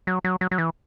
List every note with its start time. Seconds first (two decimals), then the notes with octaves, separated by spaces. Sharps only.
0.07 F#3
0.24 F#3
0.41 F#3
0.51 F#3
0.58 E3